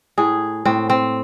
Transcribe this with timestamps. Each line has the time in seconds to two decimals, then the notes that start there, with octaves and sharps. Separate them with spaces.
0.18 A2 G#4
0.65 A2 C4
0.90 C4